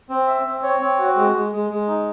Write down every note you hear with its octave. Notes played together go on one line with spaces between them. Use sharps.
C4
E5
C4
C#5
C4
F#4
G#3
G#3
G#3
G#3
D#4